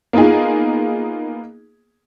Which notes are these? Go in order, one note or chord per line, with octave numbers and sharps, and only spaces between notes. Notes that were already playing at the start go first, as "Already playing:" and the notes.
A#3 B3 D#4 F4 G#4